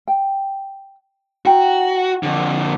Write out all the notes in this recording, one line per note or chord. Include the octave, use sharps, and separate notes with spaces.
G5
E4 F#4 G5 A#5
F2 D3